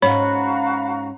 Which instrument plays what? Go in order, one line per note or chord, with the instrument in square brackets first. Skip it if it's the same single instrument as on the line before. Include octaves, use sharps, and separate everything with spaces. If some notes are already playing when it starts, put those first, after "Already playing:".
[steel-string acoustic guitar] G#2 C#4 [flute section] F#4 F5 A#5 [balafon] C#5 [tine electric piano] B5